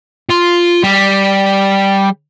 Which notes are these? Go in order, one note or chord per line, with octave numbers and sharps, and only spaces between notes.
F4
G3